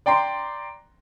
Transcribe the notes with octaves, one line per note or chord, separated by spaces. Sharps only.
D5 G5 A#5 C6